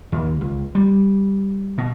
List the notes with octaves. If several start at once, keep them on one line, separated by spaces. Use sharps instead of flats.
D#2
C#2
G3
B2